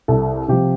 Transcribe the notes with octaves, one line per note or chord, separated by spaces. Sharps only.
C2 A4
C3 F3 G4